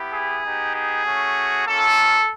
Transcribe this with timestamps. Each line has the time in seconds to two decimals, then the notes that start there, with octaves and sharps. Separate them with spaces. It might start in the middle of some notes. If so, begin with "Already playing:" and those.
Already playing: B3 E4 G4
0.13 G#4
0.43 B3 D#4 G4
0.74 G#4
1.05 A3 C#4 F#4
1.66 A#3 C#4 F4 A4